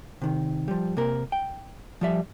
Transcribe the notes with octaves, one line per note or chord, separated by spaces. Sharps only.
C3 D#3
F3 G3
C3 A#3 A#4
G5
F3 G3 E5